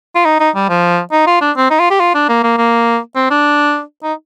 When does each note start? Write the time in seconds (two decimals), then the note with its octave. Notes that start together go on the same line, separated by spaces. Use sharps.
0.15 F4
0.25 D#4
0.40 D#4
0.55 G3
0.69 F3
1.12 D#4
1.27 F4
1.41 D4
1.56 C4
1.70 D#4
1.80 F4
1.90 G4
2.00 F4
2.14 D4
2.29 A#3
2.43 A#3
2.58 A#3
3.15 C4
3.30 D4
4.03 D#4